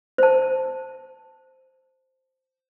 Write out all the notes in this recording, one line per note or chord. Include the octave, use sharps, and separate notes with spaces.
C5 A5